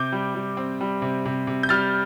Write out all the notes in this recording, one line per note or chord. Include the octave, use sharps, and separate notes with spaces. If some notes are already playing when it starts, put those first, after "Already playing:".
Already playing: C3 D6 G6
G3
G3
C4
G3
C3
C3
C3
G6
G3 F6 A6